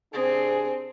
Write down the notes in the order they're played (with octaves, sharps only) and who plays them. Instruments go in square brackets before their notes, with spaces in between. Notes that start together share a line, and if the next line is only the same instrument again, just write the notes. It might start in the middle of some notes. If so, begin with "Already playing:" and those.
[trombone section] C3 D4 G#4 [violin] C4